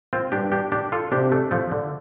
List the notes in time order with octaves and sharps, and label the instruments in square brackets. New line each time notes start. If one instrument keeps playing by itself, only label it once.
[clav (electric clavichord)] C4 F4
[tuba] G2 [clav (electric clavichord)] D4 G4
[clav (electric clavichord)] D4 G4
D4 G4
F4 A4
[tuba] C3 [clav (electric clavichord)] D4 G4
[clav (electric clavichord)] A3 D4
F3 A3
D3